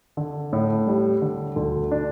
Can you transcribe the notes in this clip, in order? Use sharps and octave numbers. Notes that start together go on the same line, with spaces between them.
D3
A2
G3
D3
D2
D4